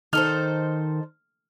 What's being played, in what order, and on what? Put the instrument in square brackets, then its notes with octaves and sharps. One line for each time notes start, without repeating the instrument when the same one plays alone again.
[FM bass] D#3 [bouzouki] D#4 A4 C5 [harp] F6